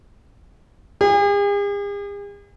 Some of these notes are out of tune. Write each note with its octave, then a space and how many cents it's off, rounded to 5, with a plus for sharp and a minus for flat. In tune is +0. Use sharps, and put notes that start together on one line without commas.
G#4 -45